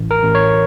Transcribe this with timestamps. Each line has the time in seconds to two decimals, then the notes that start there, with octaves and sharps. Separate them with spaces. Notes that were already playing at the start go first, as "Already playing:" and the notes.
Already playing: A1
0.11 A#4
0.22 A1
0.35 C#5